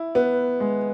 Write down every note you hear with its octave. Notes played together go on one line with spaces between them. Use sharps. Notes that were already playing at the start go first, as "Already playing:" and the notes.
Already playing: E4
B3
G#3